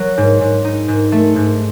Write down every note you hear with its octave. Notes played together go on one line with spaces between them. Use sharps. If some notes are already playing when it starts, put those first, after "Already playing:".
Already playing: F#3
G#2
G#2
D#4
G#2
A3
G#2